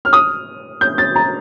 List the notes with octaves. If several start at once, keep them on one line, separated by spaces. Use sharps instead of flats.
F6
D#6
G6
A6
A#5